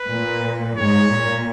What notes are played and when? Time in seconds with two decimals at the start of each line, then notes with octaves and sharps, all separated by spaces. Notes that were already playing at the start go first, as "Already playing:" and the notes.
Already playing: B4
0.09 A#2
0.77 G#2 C#5
1.12 A#2